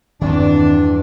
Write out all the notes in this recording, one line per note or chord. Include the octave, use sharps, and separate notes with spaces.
E2 G2 D#3 C4 D4